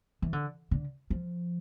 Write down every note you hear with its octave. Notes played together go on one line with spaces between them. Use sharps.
E3
D3
D3
F3